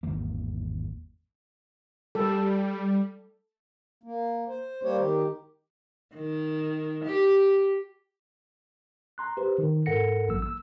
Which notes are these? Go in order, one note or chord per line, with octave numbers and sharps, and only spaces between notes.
G#1 E2 D#3 A#3
G3 A4
A#3
C5
G3 A#3 G4 C5 C#5
D#3 G4
D#3
G4
A#5 C6 F#6
G4 B4 C5
D#3
G#2 A4 A#4 F#5 A#6 C#7
A1 F#2 E3 F#3 A#3 E6
E6